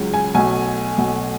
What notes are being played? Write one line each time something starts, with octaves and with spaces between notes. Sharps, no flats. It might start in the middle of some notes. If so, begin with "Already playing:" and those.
Already playing: C#2 C#3 F#3
G#5
B1 B2 A3 G#5
B1 B2 A3